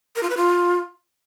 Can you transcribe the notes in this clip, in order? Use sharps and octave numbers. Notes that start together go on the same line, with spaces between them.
A#4
F4
B4
F4